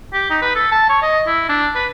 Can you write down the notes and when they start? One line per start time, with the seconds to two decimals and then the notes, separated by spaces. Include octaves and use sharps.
0.13 G4
0.30 D#4
0.42 B4
0.56 A4
0.72 A5
0.89 C#5
1.02 D#5
1.27 E4
1.49 D4
1.75 B4